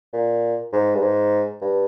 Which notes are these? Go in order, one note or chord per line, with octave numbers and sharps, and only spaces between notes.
A#2
G#2
G2
G#2
G2